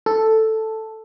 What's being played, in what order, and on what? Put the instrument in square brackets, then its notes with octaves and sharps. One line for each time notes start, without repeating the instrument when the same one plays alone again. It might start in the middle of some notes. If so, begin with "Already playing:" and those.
[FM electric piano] A4